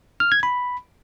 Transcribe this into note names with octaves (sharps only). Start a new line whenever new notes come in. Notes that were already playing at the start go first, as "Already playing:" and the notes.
F6
G#6
B5